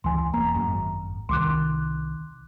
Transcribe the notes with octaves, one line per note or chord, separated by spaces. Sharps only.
C#2 E3 G#5 C6
E1 A#3 A#5
G#1 F#2
C2 D#3 C6 D6 F#6